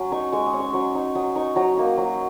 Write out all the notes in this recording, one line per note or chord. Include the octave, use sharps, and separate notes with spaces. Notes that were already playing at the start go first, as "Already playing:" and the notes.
Already playing: F#3 C#4
D#4 C#6
G#3 C#6
D#6
C#4
C#6
F#3 C#6
D#4
F#3 D#6
D#4 C#6
F#3 A#5
A#3 D#4
F#3